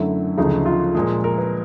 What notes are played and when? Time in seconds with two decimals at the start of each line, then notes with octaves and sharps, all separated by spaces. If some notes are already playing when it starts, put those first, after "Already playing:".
Already playing: F#2 D3 F#3 A3 E4
0.37 D2 C#3 F3 A3 D#4
0.66 F4
0.94 A#2 F3 G#3 G#4
1.24 A#4
1.38 B4